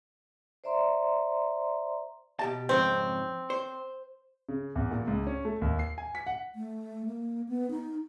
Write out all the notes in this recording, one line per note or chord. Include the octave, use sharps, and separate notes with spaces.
C5 D5 E5 A#5 C6
B2 G4 A5
F2 G#2 C#3 C4
C5
C#3
E2
A#2
C#2
C#4
A3
D#2
C7
G#5
B6
F#5
A3
A#3
B3
D#4